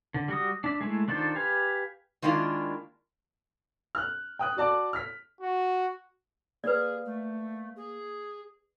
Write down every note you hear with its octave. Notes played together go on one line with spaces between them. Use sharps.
D3
G3 F#4 D#6
D4 E5
G#3 A3 E4
D#3 D4 F4 A4 C5
G4 B4 F5 G#5
D#3 G#3 A#3 D4 E4 F4
F6 F#6
G5 D#6 F#6
F#4 D5 A5 D6
F6 B6
F#4
A#3 G#4 B4 D5
A3
G#4